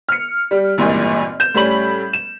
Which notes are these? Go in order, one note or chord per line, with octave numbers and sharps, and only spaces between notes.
F6 C#7
G3
G#1 C#2 G2 A#2 E3
G6 E7
A2 G3 C#4 B5 F#7
E7